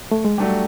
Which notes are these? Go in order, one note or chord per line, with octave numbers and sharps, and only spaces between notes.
A3
G#3
F#3 G3 A3 D4 G4